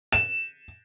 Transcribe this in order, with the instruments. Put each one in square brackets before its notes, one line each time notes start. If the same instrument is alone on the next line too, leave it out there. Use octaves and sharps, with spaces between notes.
[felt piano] E7